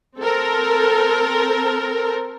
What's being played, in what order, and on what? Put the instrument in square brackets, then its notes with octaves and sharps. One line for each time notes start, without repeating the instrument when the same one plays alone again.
[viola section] C4 A4 A#4